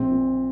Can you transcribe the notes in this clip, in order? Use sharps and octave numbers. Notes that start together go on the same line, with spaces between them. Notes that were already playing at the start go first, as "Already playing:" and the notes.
Already playing: A#1 C4
A#2